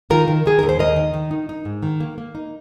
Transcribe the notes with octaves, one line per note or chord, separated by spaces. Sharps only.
D#3 F4 A#4
D#3
D#3 G#4
D#2 A#4
C5
D#2 A#4 D#5
D#3
D#3
D#4
D#4
G#2
D#3
A#3
A#3
D#4